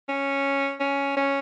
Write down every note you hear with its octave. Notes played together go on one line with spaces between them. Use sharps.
C#4
C#4
C#4